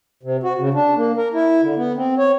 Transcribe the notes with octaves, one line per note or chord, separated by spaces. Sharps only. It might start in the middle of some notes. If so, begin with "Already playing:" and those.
C3
F#4
C#3
D4
A#3
A#4
E4
D3
B3
C4
C#5